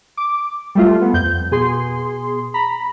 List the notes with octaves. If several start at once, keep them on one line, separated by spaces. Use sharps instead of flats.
D6
G3 A3 F4
B3
F2 G6
B2 G#4 C6
A#5 B5